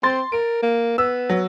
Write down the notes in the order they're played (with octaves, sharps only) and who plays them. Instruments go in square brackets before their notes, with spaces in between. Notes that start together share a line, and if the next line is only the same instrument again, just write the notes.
[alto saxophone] C4 [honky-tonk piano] C6 A6
[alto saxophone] A#4 [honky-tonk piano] D7
[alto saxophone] A#3
[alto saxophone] B3 [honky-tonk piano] E6
[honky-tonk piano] F#3